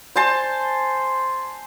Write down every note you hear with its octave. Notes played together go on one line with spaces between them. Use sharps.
C5 G#5 A5 C6